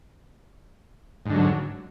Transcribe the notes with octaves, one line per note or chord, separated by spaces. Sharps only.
G#2 D3 F#3